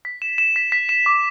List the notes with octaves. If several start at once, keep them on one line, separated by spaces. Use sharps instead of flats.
B6
E7
E7
B6
B6
E7
D6